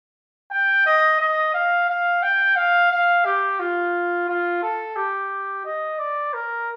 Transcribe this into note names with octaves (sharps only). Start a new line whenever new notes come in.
G5
D#5
D#5
F5
F5
G5
F5
F5
G4
F4
F4
A4
G4
D#5
D5
A#4